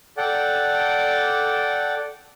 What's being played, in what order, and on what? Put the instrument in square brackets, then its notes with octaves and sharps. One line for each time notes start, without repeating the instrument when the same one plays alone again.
[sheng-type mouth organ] A4 D5 F#5 G5